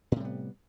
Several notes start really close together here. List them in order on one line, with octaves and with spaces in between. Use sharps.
A2 C3 G3 B3